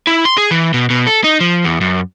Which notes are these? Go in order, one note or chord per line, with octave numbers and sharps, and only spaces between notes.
E4
C6
G#4
E3
B2
B2
A4
D#4
F3
E2
F#2